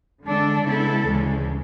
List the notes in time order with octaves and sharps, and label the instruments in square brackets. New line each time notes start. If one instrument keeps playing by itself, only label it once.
[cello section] D3 G#3 D4 A4
C#3 G#3 B3 E4 A4
D2 C#3 E3 G#3